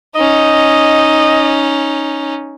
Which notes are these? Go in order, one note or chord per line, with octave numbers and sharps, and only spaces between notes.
C#4 D#4 D#5